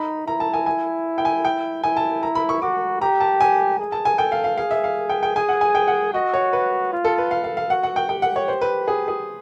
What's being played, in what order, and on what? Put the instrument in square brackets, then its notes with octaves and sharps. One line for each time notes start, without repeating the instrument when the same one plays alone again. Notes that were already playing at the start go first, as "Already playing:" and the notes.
Already playing: [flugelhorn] D#4 [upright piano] B5
[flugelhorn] E4 [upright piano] A#5
[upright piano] A5
G#5
G#5
G5
G#5
G5
[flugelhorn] E4 [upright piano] G#5
[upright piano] A5
A#5
B5
C#6
[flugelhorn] F#4 [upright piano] D6
[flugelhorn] G4 [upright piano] A#5
[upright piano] A5
G#5
[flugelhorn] G#4
[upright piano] A5
G#5
[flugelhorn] A4 [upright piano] G5
[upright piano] F5
F5
[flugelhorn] G#4 [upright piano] F5
[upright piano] E5
F5
G5
G5
[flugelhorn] G#4 [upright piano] G#5
[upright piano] F#5
G#5
G5
F#5
[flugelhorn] F#4 [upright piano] D#5
[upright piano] C#5
B4
[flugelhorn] F4
[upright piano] A4
B4
F5
F5
F5
[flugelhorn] F#4 [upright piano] F#5
[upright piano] F#5
G5
[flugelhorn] G4 [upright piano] G5
[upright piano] F#5
C#5
C5
B4
G#4
G#4